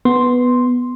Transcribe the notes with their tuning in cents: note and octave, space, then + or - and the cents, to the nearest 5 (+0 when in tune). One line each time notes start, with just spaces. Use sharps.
B3 +0 C6 +0